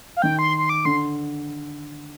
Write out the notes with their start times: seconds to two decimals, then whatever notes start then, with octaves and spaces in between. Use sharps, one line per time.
0.17 F5
0.22 D#3 G5
0.39 C6
0.58 C6
0.69 D6
0.85 D3 C6